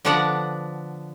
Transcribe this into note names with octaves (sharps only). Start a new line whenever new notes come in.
D3 F3 B3 D4 D5 F#5